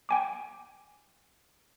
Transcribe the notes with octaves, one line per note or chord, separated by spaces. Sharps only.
G5 G#5 D6